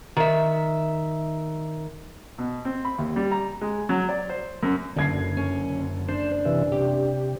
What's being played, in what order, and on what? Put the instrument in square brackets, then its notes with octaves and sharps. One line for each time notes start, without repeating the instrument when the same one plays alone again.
[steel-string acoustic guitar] D#3 E5
[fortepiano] B2
C4
B5
D#2
G3
A#5
G#3
F#3
D5
C5
F#2
[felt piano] F#1 G#6 C7 [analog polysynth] F#2 D3
[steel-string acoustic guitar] C#4
[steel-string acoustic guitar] D4 [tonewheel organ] C5
[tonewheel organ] C3 E3
[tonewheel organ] C3 [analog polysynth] G4